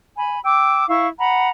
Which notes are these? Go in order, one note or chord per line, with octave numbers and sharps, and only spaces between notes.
G#5 B5
G5 D6 E6
E4 F5 C#6 E6
F#5 A#5 B5